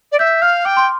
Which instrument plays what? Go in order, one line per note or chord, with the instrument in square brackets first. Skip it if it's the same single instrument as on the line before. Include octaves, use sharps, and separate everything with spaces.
[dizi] D5
[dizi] E5 [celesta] G6
[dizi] F5 [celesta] F6
[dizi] G5 [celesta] D6
[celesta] C6